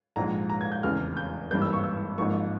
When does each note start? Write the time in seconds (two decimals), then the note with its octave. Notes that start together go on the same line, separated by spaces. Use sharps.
0.16 A#1 G#2 F3 G#3 A#5
0.50 A#5
0.61 G#6
0.72 G6
0.83 F1 E2 C#3 F6
1.17 G6
1.51 G#1 G2 E3 G3 A#3 G6
1.62 E6
1.73 C#6
1.84 E6
2.18 G#1 G#2 F3 A#3 C#6